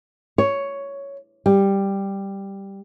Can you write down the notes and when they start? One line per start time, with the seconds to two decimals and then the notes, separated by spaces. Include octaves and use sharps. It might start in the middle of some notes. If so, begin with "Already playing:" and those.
0.38 C#5
1.46 G3